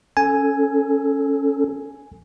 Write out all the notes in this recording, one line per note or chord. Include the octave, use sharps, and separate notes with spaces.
C#4 A4 G#5